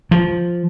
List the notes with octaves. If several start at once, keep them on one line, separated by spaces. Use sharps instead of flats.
F3